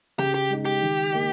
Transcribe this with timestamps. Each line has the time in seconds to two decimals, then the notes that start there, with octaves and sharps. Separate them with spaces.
0.19 C#3 G4
0.34 G4
0.49 G#3 D#4
0.65 G4
0.82 D#3
1.12 A#3 D#4